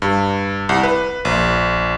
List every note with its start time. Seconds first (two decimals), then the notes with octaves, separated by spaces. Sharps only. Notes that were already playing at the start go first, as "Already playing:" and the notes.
0.02 G2
0.69 C2
0.83 B4
1.25 A#1